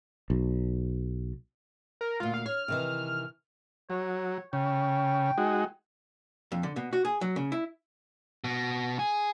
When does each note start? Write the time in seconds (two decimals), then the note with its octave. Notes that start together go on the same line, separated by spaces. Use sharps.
0.30 B1
2.01 A#4
2.20 D2 A#2 F4
2.34 F5
2.46 C#5 F6
2.68 C3 D#3 E3
3.90 F#3 C#5
4.53 C#3 G5
5.38 G#3 D#4 F#4
6.52 F2
6.63 D3
6.76 B2
6.93 F#4
7.05 G#4
7.21 F#3
7.36 C#3
7.52 E4
8.44 B2
8.99 G#4